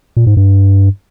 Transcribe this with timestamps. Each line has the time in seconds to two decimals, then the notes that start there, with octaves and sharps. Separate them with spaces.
0.17 A#2
0.27 G#2
0.37 G2